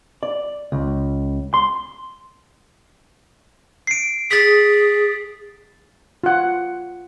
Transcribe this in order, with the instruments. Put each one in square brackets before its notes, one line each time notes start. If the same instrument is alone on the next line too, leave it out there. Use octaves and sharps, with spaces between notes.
[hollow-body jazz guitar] D5
C#2
C6
[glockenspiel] C7 D7
[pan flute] G#4 [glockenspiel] A6 B6
[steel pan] F4 F#5